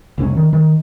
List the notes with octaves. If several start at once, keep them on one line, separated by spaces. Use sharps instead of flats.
F1 C2 C4 C#4
D#3
D#3